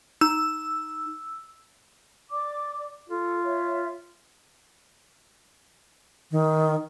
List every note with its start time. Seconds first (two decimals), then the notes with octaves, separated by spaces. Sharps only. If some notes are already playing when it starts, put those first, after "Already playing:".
0.21 D#4 E6
2.31 D5 D6
3.10 F4 A4
3.44 C#5 E5
6.31 D#3